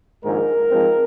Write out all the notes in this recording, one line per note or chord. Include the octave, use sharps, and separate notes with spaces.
A#1 G#2 D#3 G#3 A#4
G#2 F3 G#3 C4